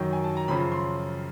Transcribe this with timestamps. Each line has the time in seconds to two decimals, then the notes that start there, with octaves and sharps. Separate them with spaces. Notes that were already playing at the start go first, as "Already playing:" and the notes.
Already playing: F#2 D#3 F#3 G5
0.13 G#5
0.24 A5
0.37 A#5
0.48 F#2 C#3 F3 B5
0.72 C6
0.84 C6